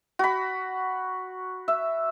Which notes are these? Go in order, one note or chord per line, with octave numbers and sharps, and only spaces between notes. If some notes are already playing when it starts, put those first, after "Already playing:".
F#4 B5
E5